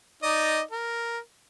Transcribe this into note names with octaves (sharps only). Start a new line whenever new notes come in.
D#4 D5 D#5
A#4